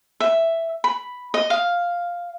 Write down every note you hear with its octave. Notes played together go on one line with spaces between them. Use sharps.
E5
B5
D#5
F5